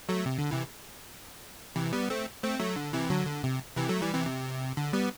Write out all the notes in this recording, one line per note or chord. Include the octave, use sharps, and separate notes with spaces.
F#3 A3
C3
D3
C3 E3
C3 E3
G3 B3
A3 C4
A3 C4
F#3 A3
D3
C3 E3
D3 F#3
D3
C3
C3 E3
F#3 A3
E3 G3
C3 E3
C3
D3
G3 B3